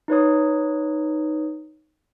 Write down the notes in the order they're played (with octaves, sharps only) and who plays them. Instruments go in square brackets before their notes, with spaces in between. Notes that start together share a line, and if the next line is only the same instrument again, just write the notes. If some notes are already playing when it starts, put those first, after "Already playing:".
[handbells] D#4 B4 C#5 D#6